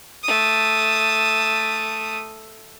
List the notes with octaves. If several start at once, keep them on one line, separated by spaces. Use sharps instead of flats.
A3 D#6